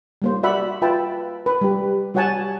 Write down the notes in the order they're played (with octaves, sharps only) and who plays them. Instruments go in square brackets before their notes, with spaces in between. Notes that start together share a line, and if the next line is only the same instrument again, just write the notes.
[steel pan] G3 A#3 C5
F#4 D5 E5 F#5 B5
F4 B4 E5 G5 A5 B5
B4
G3 G4
G3 F#4 C#5 F#5 G#5 A5